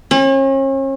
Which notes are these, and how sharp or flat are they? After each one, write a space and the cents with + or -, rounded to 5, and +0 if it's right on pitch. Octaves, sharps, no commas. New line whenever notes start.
C#4 -40